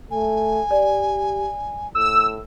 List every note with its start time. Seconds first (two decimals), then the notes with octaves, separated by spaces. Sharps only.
0.11 A3 G#5
0.71 G4 D5
1.95 A2 E6